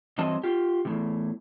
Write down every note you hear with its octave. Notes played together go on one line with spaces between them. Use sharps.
G2 E3 F#3 C4 D#5 A5
F4 G4
E2 A2 C3